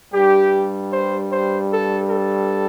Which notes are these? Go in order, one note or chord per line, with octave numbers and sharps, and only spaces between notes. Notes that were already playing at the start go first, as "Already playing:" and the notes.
G2 G3 G4
C5
C5
A4
A4